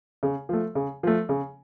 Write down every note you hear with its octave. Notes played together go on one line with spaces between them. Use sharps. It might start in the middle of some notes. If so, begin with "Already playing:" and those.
C#3
F3 A3
C#3
F3 A3
C#3